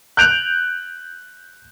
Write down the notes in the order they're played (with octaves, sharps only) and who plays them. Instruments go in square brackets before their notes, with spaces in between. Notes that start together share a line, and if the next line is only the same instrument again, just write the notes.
[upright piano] F#6 G6 D7 F7